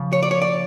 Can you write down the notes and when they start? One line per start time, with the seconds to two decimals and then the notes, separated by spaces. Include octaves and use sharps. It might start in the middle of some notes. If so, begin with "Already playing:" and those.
Already playing: C#3 F3
0.13 C#5
0.23 D5
0.31 C#5
0.42 D5